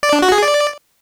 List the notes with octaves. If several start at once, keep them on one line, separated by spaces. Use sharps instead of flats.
D5
D4
F#4
G#4
D5